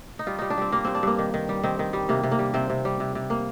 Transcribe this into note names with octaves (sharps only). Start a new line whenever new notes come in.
D#4
G3 F4
G3 D#4
D4
G3 C4
G3 A#3
G2 C4
D4
G2 A#3
D#3
D#3
G3
D#3 C4
D#3
G3
C3 A#3
C3
A#3
G3
C3 C4
C3
G3
C3
C3
A#3